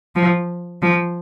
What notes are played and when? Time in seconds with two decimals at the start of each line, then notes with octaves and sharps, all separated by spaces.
0.16 F3
0.82 F3